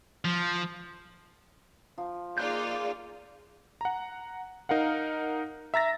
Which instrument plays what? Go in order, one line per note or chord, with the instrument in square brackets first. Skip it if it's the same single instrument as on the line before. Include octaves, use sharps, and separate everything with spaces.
[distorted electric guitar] F3
[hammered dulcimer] F3
[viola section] A#3 G#4 D5 [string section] D#4 F4 [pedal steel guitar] F5 F#6 G6
[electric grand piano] F#5 A#5
D#4 A#4 F5 F#5
E5 A#5 A6 A#6